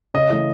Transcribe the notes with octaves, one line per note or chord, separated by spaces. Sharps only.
C#3 D#5
E3 A3 D#5